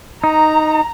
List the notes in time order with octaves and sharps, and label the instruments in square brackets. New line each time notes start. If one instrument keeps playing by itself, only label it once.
[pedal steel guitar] D#4 [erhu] A#5